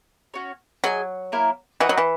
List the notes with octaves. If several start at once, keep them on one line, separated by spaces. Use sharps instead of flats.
C#4 F#4 C#5
F#3 G#4 D#5 G#5
A#3 E4 A#4
E3 D#4 F#4 B4 F#5
F#3
E3